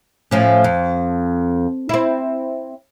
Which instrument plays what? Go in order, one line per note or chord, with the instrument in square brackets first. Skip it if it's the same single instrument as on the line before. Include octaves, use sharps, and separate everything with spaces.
[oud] A2 F3 C#4
F2
C4 E4